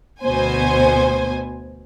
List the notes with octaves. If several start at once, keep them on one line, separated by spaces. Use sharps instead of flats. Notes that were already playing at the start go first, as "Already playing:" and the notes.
D2 B2 C5 G#5